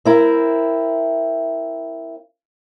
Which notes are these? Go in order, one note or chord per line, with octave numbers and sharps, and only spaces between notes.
C4 E4 A#4